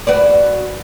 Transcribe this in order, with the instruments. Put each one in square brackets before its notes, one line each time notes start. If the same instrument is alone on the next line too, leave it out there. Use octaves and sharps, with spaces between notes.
[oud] F#4 B4 D5